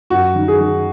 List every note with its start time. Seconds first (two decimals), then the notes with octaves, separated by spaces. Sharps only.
0.10 F#2 F#4
0.35 D#3
0.48 G#4
0.61 D#3